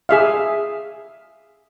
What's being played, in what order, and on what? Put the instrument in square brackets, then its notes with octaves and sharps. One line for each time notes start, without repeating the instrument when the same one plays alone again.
[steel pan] G#4 E5 F5